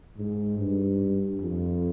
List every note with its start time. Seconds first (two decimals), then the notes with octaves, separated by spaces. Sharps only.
0.17 G#2
0.58 G2
1.40 F2